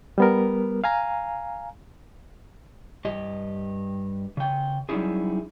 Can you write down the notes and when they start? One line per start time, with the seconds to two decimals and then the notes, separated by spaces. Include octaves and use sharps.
0.18 G3 B3 A#4
0.84 F5 G#5 A#5
3.05 G2 G4 D#5
4.37 C#3 G5
4.89 F#3 G3 C#4 D#4 E4 G#4